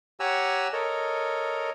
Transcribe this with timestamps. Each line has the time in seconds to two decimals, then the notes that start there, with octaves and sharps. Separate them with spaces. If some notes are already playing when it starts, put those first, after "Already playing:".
0.20 G4 C#5 F#5 G#5 A#5 E6
0.73 A4 A#4 C#5 D#5